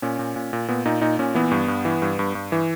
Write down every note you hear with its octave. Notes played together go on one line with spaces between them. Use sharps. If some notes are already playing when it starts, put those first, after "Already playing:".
A#2 C#4
A#2
A#2
A#2
A#2 B3
A#2 D#4
A#2 D#4
A#2 C#4
E3 B3
G2
G2
E3
G2
G2
G2
E3